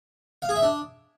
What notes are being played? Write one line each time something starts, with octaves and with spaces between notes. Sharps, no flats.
F5
G#4
E5
D4